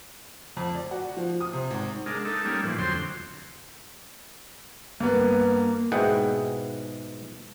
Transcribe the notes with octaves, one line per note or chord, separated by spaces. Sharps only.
F2
D5
F#4
F3
D#6
C3
G#1
G#3 D4 A#4
A3 D#4 A4
G3 A#3 C#4 D#4 A4
A2 E3 F3
F2 D3 F#3 C4 C6
G2 A#3 B3
G#2 B2 E4 G#4 F#5 G5